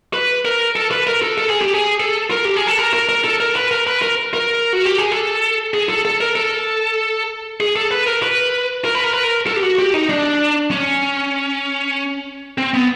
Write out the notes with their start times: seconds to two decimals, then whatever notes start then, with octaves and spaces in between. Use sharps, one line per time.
0.14 B4
0.45 A#4
0.76 A4
0.91 B4
1.07 A#4
1.22 A4
1.38 A4
1.50 G#4
1.62 G4
1.73 G#4
2.00 A4
2.31 A#4
2.45 G4
2.56 G#4
2.67 A4
2.78 A#4
2.94 A#4
3.09 A#4
3.24 A4
3.40 A#4
3.56 B4
3.71 A#4
3.87 B4
4.02 A#4
4.34 A#4
4.73 F#4
4.86 G4
4.98 G#4
5.12 A4
5.74 G#4
5.89 A4
6.05 A4
6.20 A#4
6.35 A4
7.60 G#4
7.76 A4
7.91 B4
8.07 A#4
8.22 B4
8.85 A#4
8.94 B4
9.04 A#4
9.14 B4
9.23 A#4
9.47 A4
9.56 G4
9.63 F#4
9.79 G4
9.94 D#4
10.10 D4
10.71 C#4
12.58 C4
12.74 B3